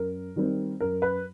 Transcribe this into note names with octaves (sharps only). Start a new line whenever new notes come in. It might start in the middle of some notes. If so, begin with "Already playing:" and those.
Already playing: F#2 A#4
D#3 G3 C4
F#2 A#4
B4